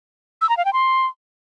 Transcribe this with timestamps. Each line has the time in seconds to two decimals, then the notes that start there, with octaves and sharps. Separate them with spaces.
0.41 E6
0.49 A#5
0.57 F5
0.65 G5
0.73 C6